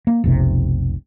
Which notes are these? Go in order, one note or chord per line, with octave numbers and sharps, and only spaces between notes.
A#3
F1 B1 C3